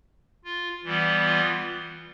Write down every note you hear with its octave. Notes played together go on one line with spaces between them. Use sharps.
F4
E3 G3 B3
F4